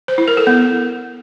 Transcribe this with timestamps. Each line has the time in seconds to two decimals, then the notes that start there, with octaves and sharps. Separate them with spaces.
0.08 C5
0.18 E4
0.28 A#4
0.37 A4
0.47 B3